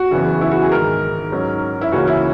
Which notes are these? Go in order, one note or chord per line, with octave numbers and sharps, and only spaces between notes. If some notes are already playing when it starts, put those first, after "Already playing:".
Already playing: F#4
F#1 E2 C#3 E3 B3
E4
F#4
G#4
G#2 D#3 G#3 A#4
G#2 F#3 C#4
E4
C#2 C#3 E3 A#3 C#4 F#4
E4